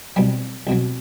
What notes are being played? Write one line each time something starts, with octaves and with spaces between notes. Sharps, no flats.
C2 B2 F#3 G3
C2 B2 F#3